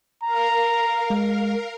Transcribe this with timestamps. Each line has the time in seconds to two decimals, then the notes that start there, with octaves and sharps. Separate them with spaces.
0.24 A#4 F5 A#5
1.10 G#3